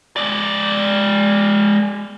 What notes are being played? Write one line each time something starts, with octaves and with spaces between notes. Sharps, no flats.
G#3 D5